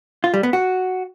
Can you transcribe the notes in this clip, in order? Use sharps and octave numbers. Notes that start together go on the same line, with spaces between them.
F4
G3
B3
F#4